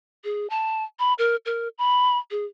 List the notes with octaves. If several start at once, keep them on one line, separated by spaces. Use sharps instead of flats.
G#4
A5
B5
A#4
A#4
B5
G#4